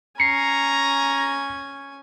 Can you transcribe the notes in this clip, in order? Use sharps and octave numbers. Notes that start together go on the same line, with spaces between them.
C#4 G#5 A#5 C7 C#7